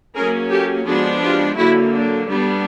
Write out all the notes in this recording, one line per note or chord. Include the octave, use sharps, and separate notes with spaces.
F#3 A#3 C#4 G#4 A#4
G4 A4
F3 G#3 B3 D4 F#4 G#4
F4 G4
D3 F#3 A#3 E4 F#4
D4
G3 B3 D4